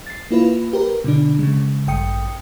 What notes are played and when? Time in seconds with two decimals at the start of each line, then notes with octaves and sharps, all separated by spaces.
0.06 A6 C7
0.31 A#3 E4 F4 B4
0.73 G4 A#4 B4
1.04 B2 D3 D4
1.39 C#3 G#3
1.87 A1 G2 G5 D#6 C#7